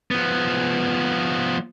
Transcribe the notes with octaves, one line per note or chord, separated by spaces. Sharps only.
F3 B3